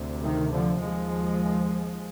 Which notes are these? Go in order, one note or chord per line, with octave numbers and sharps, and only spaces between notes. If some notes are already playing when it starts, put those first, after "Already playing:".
Already playing: D2 C3
D#3
D3 F3
D#2 F3 G#3